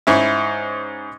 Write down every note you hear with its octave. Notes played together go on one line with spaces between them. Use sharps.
G#2 C#4 E4